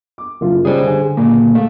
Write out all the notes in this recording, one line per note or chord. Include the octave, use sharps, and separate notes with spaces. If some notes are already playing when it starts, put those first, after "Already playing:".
D6
F#1 F4
C#3 G3 C#4 G#4 C5
D3 G#5
C#2 A#2 A#3
A3 F5